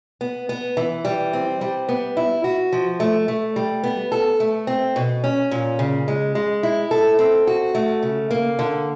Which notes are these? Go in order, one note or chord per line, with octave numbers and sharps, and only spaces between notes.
B3
B3
E3
G3
C4
G3
B3
E4
F#4
F3
A3
A3
G3
B3
A4
A3
C4
B2
C#4
A#2
C#3
G#3
G#3
E4
A4
C4
F#4
A3
C#3
A#3
D3